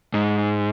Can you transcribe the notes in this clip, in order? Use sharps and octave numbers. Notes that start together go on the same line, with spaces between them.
G#2